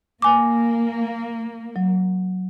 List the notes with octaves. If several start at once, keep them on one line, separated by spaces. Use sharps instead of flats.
A#3 G#5 D6
F#3